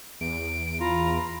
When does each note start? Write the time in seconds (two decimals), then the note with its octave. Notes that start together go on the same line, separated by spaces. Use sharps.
0.21 E2 D7
0.80 F4 A#5 B5